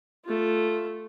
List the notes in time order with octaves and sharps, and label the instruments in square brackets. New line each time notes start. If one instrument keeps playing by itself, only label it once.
[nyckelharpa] A3 F4